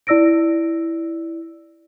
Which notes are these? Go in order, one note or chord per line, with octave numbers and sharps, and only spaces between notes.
E4 D5 E6 A#6 D7